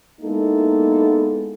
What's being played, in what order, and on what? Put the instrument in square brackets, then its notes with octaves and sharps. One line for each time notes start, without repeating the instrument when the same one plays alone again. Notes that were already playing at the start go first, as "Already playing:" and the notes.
[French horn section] G#3 A#3 B3 D#4 E4 A4